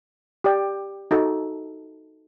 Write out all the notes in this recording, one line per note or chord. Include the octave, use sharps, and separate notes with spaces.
G4 D5 G5
D#4 F#4 A4